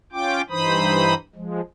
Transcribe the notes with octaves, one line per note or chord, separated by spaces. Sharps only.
C#4 F4 G5 D6
G2 E3 D#4 C5 B5 D#6
F3 G#3